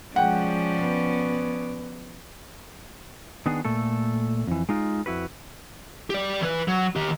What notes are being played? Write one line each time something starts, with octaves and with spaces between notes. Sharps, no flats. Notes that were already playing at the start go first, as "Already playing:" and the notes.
F3 G#3 C#4 D5 F#5 G5
B3
D#3 B3 D4 G#4
A#2 A3 A4
F2 E3
G#3 D#4 F4
F2 E4 F#4 B4
G4 D5
E3 B4
F#3
D#3 G4